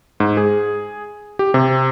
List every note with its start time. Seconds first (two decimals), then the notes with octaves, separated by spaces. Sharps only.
0.20 G#2
0.37 G#4
1.39 G4
1.54 C3